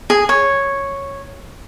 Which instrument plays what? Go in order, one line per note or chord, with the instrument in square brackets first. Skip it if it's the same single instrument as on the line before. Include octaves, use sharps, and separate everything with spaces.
[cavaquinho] G#4
C#5